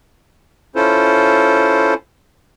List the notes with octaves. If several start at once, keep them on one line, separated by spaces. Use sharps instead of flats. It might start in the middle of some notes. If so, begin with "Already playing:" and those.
C#4 E4 F4 A4 C5